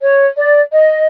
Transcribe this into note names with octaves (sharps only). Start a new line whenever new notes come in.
C#5
D5
D#5